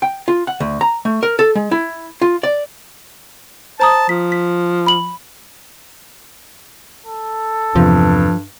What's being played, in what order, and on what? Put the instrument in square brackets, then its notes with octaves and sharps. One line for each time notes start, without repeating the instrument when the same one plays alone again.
[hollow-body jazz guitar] G5
F4
F#5
D2
A#5
A3
A#4
A4
G#3
E4
F4
D5
[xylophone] C5 A#5 D#6 [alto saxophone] A5
[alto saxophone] F3 [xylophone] B6
[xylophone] B6
B5 F#7
[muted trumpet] A4
[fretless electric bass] E2 C3 [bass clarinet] G2 [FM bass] F3